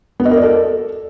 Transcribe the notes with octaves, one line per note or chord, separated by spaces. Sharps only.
B3
D#5
A#4
D5
A4